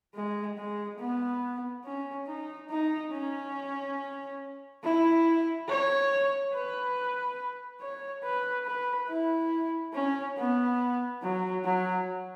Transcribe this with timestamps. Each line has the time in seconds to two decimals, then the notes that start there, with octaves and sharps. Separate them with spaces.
0.15 G#3
0.57 G#3
0.99 B3
1.85 C#4
2.27 D#4
2.70 D#4
3.12 C#4
4.83 E4
5.68 C#5
6.54 B4
7.81 C#5
8.24 B4
8.66 B4
9.09 E4
9.94 C#4
10.37 B3
11.22 F#3
11.64 F#3